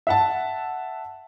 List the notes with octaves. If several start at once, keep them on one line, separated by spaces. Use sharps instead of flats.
E5 F#5 A5